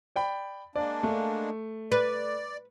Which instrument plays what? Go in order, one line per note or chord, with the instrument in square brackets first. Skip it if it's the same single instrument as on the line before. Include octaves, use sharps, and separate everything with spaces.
[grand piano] D5 G5 B5
[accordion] G#3 A#3 D4 [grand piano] D5
[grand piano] A3
[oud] B4 [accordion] D5